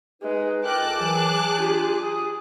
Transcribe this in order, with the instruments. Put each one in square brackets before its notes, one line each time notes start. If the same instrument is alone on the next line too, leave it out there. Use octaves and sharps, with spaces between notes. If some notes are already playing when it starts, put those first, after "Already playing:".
[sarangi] G#3 [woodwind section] D#4 B4
[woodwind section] C#2 A4 A#4 [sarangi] G5 [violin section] A5 D6 F#6
[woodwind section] E3 F#3 [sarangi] G#4
[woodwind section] D4 F4 G4
D#6